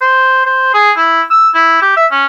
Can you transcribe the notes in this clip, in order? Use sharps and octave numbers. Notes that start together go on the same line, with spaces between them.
C5
C5
G#4
E4
E6
E4
G4
E5
C#4